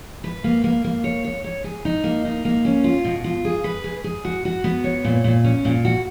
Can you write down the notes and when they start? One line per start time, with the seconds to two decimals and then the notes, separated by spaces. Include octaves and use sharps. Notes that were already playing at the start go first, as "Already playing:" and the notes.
0.24 B4
0.44 A#3
0.64 A#3
0.84 A#3
1.04 C#5
1.24 C#5
1.44 C#5
1.64 G#4
1.85 D#4
2.04 A#3
2.25 D#4
2.45 A#3
2.65 C#4
2.84 F4
3.04 B2
3.24 F4
3.45 G#4
3.64 B4
3.84 G#4
4.04 G#4
4.25 F#4
4.45 F#4
4.64 B3
4.84 C#5
5.05 A#2
5.24 A#2
5.44 C#4
5.65 A#2
5.85 F#4